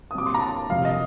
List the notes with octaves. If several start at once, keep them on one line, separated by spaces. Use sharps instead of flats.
D#6
A#2 G3 C4 D6
C6
A#5
A5
F2 C3 G3 F5
D#5